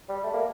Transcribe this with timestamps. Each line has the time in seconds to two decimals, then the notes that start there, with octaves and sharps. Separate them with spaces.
0.09 G3
0.24 A3
0.34 A#3